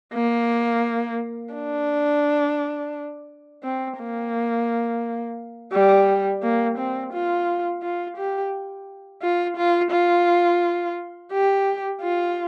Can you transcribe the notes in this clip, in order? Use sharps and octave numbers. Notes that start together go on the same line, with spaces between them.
A#3
D4
C4
A#3
G3
A#3
C4
F4
F4
G4
F4
F4
F4
G4
F4